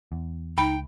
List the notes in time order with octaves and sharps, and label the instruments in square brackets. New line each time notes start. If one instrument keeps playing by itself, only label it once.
[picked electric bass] E2
[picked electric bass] C#2 [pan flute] D#4 [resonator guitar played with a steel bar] G5 [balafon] B5